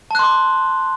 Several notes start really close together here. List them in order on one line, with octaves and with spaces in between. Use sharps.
A5 F#6 C6 D6